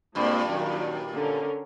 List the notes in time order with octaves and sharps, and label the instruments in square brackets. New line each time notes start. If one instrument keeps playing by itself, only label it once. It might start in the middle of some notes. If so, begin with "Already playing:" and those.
[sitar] G2 A#2 [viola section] G#3 A#3 C4
[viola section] D#3 F#3 C#4
D3 C#4 A#4